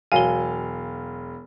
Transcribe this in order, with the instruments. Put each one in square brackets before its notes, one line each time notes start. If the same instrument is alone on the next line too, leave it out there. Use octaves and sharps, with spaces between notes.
[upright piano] E1 F#3 F5 [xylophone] G#5 G7